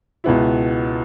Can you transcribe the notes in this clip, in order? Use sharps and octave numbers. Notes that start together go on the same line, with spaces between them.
C#2 B2 B3 E4